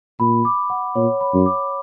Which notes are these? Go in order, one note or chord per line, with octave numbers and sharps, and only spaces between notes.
A#2 B5
D6
F#5
A#2 C#5
B5
F#2
D6